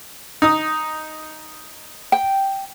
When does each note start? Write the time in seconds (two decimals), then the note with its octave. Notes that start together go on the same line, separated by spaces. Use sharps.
0.42 D#4 D#6
2.12 G5